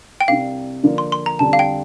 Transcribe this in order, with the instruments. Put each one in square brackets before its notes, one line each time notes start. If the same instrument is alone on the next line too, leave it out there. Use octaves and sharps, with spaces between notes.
[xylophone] G5
[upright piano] C2 C3 G3 D4 [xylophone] F5
[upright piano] D3 F3 A#3 D4 F4
[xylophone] C6
C6
A#5
[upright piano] F2 D3 G3 [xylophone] A5
[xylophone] F5
G5